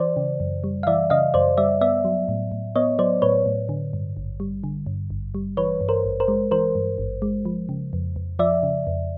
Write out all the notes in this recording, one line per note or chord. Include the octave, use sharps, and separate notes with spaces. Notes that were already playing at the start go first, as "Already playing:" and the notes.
Already playing: E3 C5 D5
C#3
F#2
G3
F5
E3 D5 E5
C#3 D#5 F5
F#2 C5 D5
G3 D5 E5
B3 D5 E5
F#3
A2
A2
B3 C#5 D#5
F#3 C5 D5
A2 B4 C#5
A2
D3
G2
G#1
G3
D3
G2
G#1
G3
E3 B4 C#5
G2
A#4 C5
G#1
A#4 C5
G#3
E3 A#4 C5
G2
G#1
G#3
F3
C#3
F2
F2
F3 D5 E5
C#3
F2